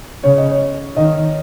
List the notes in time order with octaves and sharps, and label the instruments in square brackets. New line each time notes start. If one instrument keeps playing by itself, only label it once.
[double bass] C#3 [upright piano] C#5
[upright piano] D#5
C#5
[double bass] D#3 [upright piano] D#5